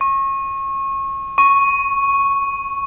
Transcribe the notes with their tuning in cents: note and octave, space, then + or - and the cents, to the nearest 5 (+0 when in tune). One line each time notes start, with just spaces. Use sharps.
C#6 -30
C#6 -5